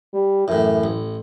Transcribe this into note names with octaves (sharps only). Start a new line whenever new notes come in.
G3
F#2 A2 E3
A1